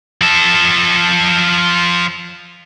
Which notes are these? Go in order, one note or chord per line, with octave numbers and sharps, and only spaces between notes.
F3 A4